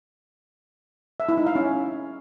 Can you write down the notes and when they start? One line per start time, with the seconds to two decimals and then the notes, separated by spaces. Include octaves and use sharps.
1.20 E5
1.29 E4
1.38 D#4
1.46 F5
1.55 C#4